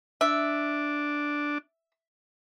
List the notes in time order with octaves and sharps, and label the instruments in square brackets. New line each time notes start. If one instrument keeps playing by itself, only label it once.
[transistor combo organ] D4 [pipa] E5